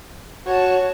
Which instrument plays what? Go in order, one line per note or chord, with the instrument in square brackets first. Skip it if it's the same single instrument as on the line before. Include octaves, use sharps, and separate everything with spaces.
[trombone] F#4 [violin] C#5 A5